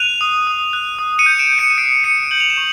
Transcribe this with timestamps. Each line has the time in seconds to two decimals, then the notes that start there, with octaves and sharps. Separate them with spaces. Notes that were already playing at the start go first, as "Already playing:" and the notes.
Already playing: F#6 D#7 F7
0.21 D#6
0.47 D#6
0.73 F#6
0.99 D#6
1.19 C#7 D#7
1.26 G6
1.39 D7 E7
1.53 G6
1.58 C#7 D#7
1.70 D#7
1.78 D#6 C7 D7
2.04 D#6 C#7 D#7
2.31 G6 F#7
2.40 F7
2.50 E7
2.57 C#6